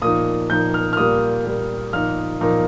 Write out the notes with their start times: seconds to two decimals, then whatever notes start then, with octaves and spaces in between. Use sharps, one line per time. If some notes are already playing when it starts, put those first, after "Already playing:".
0.02 A#2 F3 D#4 D#6
0.50 A#2 F3 D#4 G6
0.74 F6
0.93 F6
0.97 A#2 G3 A#3 D#6
1.45 A#2 G3 A#3
1.93 A#2 F3 A#3 D#4 F6
2.41 A#2 F3 A#3 D#4